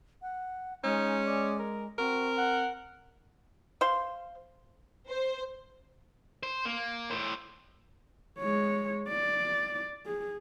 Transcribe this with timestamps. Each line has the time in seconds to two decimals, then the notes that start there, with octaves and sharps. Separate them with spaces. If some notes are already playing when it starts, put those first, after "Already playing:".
0.22 F#5
0.84 G#3 C#4 D#4
1.26 D5
1.59 A#4
1.99 C4 F#4 A#4
2.37 F#5
3.81 C5 F5 C6
5.09 C5
6.43 C5
6.65 A#3
7.11 A2 C5
8.39 G#3 C#5
9.09 D5
10.06 G#4